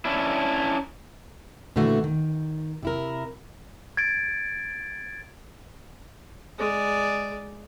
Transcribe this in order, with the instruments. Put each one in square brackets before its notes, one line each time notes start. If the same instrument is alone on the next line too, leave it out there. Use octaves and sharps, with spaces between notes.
[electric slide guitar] C#4 D4 E4
[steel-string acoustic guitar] A#2 D3 E3 A3 F#4
D#3
C3 E4 A#4
[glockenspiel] G#6 A6 D7
[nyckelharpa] G#3 D5